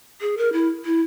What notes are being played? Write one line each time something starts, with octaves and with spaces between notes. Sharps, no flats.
G#4
A#4
E4
E4